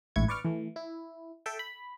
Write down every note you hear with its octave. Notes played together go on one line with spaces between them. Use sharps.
A1 G#2 E4 C#6 G#6
B4 D5 C#6 D6 F6
E3 A3
E4
A4 E5 G5
B5